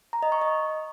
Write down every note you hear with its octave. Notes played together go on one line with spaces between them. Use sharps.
A#5
D#5
C#6
D#5